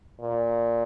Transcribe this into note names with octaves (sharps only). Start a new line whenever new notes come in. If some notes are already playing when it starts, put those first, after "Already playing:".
A#2